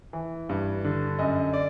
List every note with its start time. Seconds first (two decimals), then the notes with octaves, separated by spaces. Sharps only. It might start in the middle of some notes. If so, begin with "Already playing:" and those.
0.13 E3
0.49 G2
0.84 D3
1.19 F#2 D#5
1.53 D5